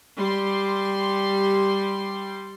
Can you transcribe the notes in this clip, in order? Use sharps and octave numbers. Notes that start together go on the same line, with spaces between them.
G3 C6